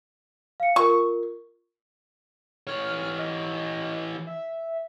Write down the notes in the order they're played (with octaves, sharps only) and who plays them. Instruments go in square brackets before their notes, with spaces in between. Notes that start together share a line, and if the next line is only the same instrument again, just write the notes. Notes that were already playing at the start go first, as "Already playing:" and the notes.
[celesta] F5 C#7
[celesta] F4 A#4 [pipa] C#6
[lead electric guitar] E3 C#5 [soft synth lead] F6
[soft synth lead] D#5
E5